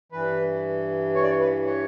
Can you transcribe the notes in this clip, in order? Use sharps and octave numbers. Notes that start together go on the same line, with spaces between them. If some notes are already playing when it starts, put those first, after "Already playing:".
G2 E3 B4
C#5
D5
C#5
B4
C#5